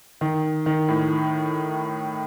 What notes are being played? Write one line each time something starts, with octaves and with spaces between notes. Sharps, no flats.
D#3
D#3
A2